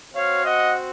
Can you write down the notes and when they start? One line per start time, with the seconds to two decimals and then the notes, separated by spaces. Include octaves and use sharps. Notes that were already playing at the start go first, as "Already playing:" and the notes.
0.13 C4 F#4 C#5 F5
0.44 D#5 F#5